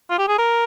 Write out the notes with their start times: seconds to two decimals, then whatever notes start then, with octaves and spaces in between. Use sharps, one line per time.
0.10 F4
0.19 G4
0.28 G#4
0.38 A#4